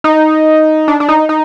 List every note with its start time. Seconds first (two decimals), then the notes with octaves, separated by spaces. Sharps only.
0.04 D#4
0.88 D4
1.00 D4
1.09 D#4
1.29 D#4